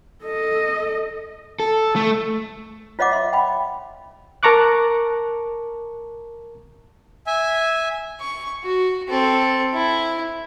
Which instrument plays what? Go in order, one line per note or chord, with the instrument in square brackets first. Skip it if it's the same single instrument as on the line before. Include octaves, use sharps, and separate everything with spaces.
[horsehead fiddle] A4 D#5
[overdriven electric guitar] A4
A3
[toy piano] F4 C#5 D#5 F#5 D6
D#5 E5 C6
G5 B5
[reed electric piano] A#4 A5 A#5 C#6 D6 F#6
[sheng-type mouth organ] E5 G#5
[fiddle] C#6
F#4
C4 A4
E4